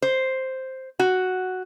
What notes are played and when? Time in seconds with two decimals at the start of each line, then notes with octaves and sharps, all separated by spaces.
0.02 C5
0.99 F#4